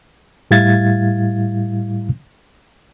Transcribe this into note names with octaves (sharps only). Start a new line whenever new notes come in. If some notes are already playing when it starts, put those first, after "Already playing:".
A2 G3 E4 F5 G#6 A6